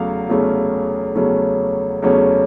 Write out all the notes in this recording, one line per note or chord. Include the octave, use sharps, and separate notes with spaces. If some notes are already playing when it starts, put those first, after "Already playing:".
Already playing: E2 C#3 F#3 A3 C#4 F5
E2 C#3 F#3 A3 C#4
E2 C#3 F#3 A3 C#4
E2 C#3 F#3 A3 C#4